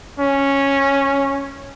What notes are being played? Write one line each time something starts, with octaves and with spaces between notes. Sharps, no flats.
C#4